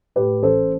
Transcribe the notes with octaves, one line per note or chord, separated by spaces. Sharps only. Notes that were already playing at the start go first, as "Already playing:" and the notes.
A2 G4 B4
A1 A4 C5